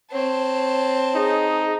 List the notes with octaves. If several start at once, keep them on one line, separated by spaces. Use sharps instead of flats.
C4 C#5 A5
D#4 G#4